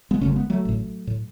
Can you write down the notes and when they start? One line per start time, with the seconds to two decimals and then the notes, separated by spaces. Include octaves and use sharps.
0.11 G#3 B3
0.21 G#1 F#2 C#3 A3 C#4
0.36 G#3 B3
0.50 F#3 A3
0.65 A1 A2
1.07 A2